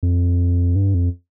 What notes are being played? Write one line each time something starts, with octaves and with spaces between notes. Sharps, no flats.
F2
G2
F2